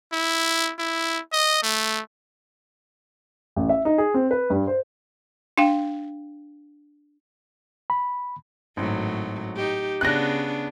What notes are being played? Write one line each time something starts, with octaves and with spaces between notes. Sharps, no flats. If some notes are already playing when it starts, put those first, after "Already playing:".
E4
E4
D#5
A3
A1
E5
D#4
G#4
C4
B4
G2
C5
D4 F5 G5
B5
G#1 A2 F#3
D#4 G4
C#3 B3 D4 F#6 A#6